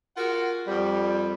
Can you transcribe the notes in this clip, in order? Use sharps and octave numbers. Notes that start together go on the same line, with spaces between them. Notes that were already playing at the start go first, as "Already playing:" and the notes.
F4 F#4 G#4 A#4 F#5
F2 G3